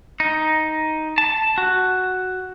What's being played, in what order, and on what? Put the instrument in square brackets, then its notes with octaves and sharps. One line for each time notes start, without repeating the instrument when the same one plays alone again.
[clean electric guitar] D#4
A5
F#4